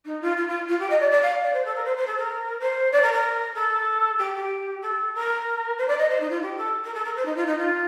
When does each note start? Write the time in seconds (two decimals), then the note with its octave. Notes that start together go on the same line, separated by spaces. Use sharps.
0.05 D#4
0.21 F4
0.36 F4
0.48 F4
0.68 F4
0.79 G4
0.90 D#5
1.00 D5
1.10 D5
1.22 F5
1.42 D5
1.53 C5
1.64 A4
1.75 A#4
1.84 C5
1.96 C5
2.06 A4
2.17 A#4
2.60 C5
2.92 D5
3.02 A#4
3.12 A#4
3.54 A4
4.18 G4
4.34 G4
4.81 A4
5.14 A#4
5.78 C5
5.87 D5
5.98 D#5
6.09 C5
6.20 D#4
6.30 F4
6.41 G4
6.57 A4
6.84 A#4
6.94 A4
7.04 A#4
7.15 C5
7.25 D#4
7.36 F4
7.46 D#4
7.57 F4